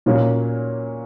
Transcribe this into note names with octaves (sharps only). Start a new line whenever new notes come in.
A#2 F#3 A#3 C#4